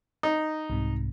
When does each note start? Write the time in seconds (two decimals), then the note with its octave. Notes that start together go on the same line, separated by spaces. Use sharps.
0.23 D#4
0.70 C2 G#2 C3